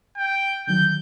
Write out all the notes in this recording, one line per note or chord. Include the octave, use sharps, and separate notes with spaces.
G5
D3 D#3 F#3 G6